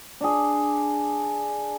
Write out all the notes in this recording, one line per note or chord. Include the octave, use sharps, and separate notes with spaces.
D4 G#4